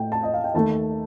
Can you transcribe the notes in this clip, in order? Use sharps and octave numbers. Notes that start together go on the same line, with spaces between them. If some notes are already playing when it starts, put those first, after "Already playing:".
Already playing: A2 A3 G5
A5
D#5
F5
G5
D#2 D#3 A3 A5